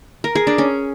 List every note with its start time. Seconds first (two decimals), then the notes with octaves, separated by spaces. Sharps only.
0.24 A#4
0.35 G#4
0.47 D4
0.58 C#4